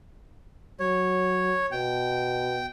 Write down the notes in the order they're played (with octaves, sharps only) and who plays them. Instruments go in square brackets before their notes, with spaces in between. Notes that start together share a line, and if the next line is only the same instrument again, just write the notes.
[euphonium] F#3 [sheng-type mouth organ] C#5
[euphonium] B2 [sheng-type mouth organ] G5